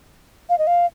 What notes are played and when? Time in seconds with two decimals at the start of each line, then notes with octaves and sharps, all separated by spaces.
0.49 F5
0.58 D#5
0.67 F5